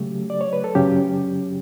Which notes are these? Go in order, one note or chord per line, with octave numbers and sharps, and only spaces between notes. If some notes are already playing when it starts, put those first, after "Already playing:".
Already playing: C#3 F#3 A3 G4
D5
C#5
B4
A4
F#2 C#3 F#3 C#4 G4